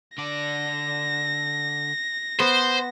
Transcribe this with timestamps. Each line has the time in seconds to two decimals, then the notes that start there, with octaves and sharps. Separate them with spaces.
0.18 D3 D5 A#6
2.40 B3 C5